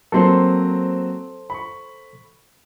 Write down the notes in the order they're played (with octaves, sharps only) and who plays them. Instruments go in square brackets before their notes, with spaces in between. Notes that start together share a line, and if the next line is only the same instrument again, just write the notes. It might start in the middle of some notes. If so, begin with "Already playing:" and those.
[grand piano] F#3 A#3 C4 [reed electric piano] A4 C5 C6
[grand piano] B5 C#6